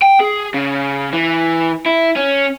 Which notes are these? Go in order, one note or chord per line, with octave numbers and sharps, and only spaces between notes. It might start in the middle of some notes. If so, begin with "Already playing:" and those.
G5
G#4
C#3
E3
E4
C#4